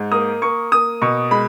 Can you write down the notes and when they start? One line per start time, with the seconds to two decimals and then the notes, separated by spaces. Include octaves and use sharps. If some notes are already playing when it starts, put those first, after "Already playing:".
Already playing: G#2
0.11 A#3 D#6
0.42 A#3 C#6
0.72 A#3 D#6
1.02 B2 C#6
1.31 G#3 B5